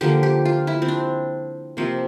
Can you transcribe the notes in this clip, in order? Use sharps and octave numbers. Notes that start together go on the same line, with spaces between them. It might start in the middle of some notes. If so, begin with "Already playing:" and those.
D3 F3 A#3 G4
G4
F4
E4
C4
D4
C3 F3 A#3 C4